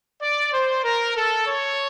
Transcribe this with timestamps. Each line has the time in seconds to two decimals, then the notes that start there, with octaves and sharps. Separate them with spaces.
0.22 D5
0.53 C5
0.84 A#4
1.16 A4
1.47 C#5